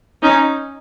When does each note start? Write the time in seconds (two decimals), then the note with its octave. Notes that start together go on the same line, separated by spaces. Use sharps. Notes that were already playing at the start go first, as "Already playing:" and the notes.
0.23 C#4 D#4